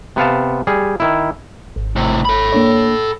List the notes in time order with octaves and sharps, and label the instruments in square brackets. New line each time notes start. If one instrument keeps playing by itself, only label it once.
[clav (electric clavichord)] C3 B3 F5 A5
G3 G#4
D#3 E4
[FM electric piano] G#1
[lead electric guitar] A2 C3
A4 B5
[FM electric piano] A#3 D4 C#5